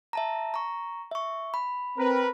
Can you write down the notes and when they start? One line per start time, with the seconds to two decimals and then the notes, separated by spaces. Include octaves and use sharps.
0.13 E5 A5 A#5
0.54 A#5 C#6
1.11 E5 C#6
1.54 B5
1.98 C4 A#4 B4